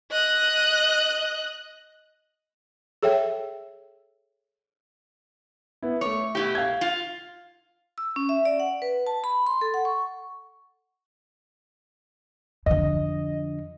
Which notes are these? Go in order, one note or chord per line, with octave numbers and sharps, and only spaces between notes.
D#5 F#6
G#4 A4 C#5 E5 G5
B3 E4
A3 C#5 D6
B2 E4 G4
F5 G#6
F4
E6
C#4
E5
D5
F#5
B4
A5
B5
C6
A4
F#5
C#6
F2 D3 D#5